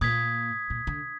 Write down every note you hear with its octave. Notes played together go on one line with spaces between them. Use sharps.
A#2 D#6 G#6 B6
A#2
D3